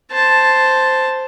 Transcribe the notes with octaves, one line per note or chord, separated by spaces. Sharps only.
C5 A5